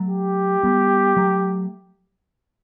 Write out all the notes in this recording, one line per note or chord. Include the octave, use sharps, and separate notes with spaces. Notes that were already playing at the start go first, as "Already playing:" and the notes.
Already playing: F#3 A3
G4
G3 B3
F#3 A3